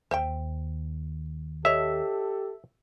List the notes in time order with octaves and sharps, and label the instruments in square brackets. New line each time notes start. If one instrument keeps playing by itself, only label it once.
[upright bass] D#2 [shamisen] C5 E5 G5
[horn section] G4 A4 [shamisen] C#5 D#5 [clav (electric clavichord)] E5